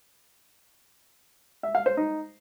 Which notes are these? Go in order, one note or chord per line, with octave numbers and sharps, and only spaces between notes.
E5
F5
C5
D#4